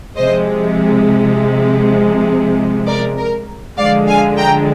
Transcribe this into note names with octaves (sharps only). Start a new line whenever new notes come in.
C3 F3 G#3 C5 D#5
A#4 D5
A#4
D3 F3 G#3 D5 F5
F5 G#5
G5 A#5